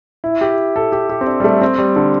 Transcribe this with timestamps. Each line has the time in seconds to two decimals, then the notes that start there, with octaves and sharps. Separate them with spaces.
0.24 E4
0.41 G4
0.76 A4
0.92 G4
1.09 G4
1.21 C4
1.27 D4
1.40 G3
1.44 A3
1.62 C4
1.78 G3
1.96 D3